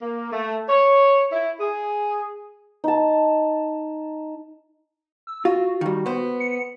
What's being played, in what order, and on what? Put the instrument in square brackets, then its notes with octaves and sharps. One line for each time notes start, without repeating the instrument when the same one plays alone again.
[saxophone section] A#3
A3
C#5
E4
G#4
[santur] D#4 A5
[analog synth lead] E6
[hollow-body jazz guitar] F4 [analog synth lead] F#4
[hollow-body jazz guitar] D#3 G3 [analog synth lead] F#4
[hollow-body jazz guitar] B3 C5
[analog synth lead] C#7